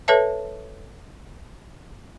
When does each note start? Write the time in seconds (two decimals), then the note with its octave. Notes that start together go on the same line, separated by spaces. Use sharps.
0.08 A4 B4 C#5 E5 A5